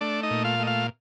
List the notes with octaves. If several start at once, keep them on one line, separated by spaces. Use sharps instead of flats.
A3 D4 D5
D#4 D#5
A#2
F4 F5
A3 D#5
F4 F5